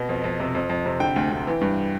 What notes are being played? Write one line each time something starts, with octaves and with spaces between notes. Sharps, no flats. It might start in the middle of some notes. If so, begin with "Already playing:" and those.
Already playing: B2
F2
F2
C3
F2
F2
C3
D3 G5
D2
D2
E3
G2